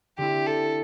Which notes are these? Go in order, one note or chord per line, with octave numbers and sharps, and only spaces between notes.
D3 C4 E4 G4
A4